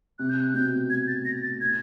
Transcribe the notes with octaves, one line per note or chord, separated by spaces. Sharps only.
C3 F#6
G6
F#6
B2 G6
A2 G#6
A6
A2 A#6
A6
A2 G#6